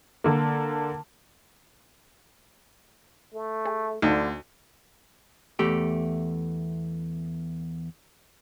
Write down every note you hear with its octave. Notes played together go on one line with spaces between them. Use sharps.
D3 A#3
A3
G#4
D2 D3 D#4 F5
E2 A3 G4